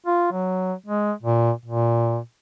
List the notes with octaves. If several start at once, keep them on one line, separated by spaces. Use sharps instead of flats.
F4
F#3
G#3
A#2
A#2